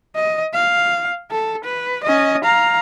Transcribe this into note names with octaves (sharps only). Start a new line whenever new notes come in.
D#5
F5
A4
B4
C#4 D#5
F5 A#5